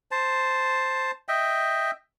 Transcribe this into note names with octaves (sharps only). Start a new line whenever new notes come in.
C5 A5
D#5 E5 G5